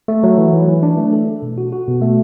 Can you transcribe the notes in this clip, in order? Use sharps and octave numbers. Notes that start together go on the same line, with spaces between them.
A3
F#3
E3
E3
E3
D4
A3
A4
A4
B2
F#4
F#4
B2
A3